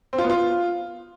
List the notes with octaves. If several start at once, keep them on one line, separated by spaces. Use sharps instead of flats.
C4
F4
B3
F4